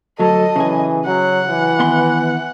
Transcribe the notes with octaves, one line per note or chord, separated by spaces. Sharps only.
D2 F#3 A4 D#5
C#3 E3 G#4
F#3 F#5
E3
D#3 B3 C6